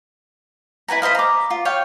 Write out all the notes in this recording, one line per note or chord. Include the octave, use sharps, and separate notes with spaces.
E4 B4 G#5 A#5
B4 C5 D#5 F5
A#5 D6
F4
C#5 F5 G5